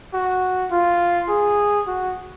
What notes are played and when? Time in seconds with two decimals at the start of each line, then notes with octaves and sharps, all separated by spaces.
0.14 F#4
0.71 F4
1.29 G#4
1.87 F#4